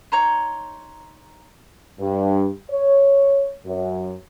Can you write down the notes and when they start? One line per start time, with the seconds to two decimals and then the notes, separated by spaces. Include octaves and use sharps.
0.12 D#4 C#5 A#5 C6
2.00 G2
2.70 C#5
3.66 F#2